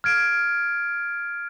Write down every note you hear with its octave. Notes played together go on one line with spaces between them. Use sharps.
F6 G#6 D7